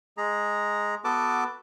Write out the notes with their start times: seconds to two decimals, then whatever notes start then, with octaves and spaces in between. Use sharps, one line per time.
0.17 G#3 G#4 A#5
1.04 B3 F#4 A4 B4 A5 D6